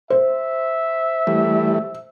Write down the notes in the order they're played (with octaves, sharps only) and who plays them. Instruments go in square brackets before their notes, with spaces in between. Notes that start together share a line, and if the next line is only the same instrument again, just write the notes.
[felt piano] C5 [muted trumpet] E5
[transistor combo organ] E3 G3 A3